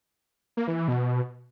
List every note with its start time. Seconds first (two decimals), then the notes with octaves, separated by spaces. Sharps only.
0.57 A#3
0.67 E3
0.78 E3
0.88 B2